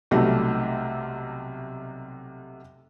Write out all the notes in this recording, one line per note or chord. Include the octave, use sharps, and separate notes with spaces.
B1 C3 F#3 G3 A3 B3